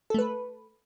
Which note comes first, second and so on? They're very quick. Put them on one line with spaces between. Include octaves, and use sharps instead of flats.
A4 A3 B4